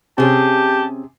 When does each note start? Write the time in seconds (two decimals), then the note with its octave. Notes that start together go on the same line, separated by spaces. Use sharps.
0.18 C3 C4 C#4 G4 G#4 A5